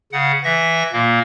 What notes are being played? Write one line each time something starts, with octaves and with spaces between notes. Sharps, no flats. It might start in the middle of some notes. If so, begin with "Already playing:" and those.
C#3 F#5
E3 E5 A#6
A#2 A#3